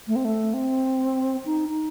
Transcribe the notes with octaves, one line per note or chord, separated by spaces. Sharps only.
A3
C4
A3
C4
D#4
D#4